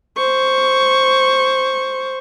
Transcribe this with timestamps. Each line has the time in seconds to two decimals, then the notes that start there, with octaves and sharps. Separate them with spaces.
0.17 C5 C#6